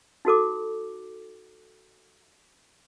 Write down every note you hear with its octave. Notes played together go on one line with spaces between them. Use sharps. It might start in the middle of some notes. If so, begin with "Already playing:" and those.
D#4 F#4 A4 D6